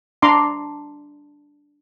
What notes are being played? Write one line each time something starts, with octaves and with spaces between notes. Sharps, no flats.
D4 A#5 C6 D6